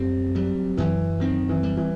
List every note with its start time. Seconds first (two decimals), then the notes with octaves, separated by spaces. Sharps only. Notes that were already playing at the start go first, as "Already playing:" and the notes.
Already playing: F#2 G3 C4
0.35 F#3 G3
0.77 F#2 E3
1.20 D#3 C4
1.49 E3
1.63 G3
1.77 E3